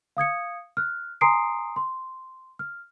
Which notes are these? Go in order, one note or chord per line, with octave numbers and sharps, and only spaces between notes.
F5 D#6 G#6 C#7
F6 F#6
G#5 A#5 C6 D#6 C7 D7
C6
F6